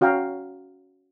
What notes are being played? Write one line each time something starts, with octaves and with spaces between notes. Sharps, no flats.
C#4 F#4 F5 G5 A#5